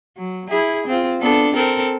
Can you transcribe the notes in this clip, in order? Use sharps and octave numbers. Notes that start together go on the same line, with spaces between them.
F#3
E4 G#4
C4 F4
B3 D4 A4
C4 A4 A#4